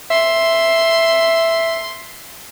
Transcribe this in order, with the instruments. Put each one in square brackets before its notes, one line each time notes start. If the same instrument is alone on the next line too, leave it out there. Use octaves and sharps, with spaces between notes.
[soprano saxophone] E5 [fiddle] C6